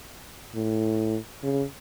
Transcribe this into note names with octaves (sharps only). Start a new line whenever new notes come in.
A2
C#3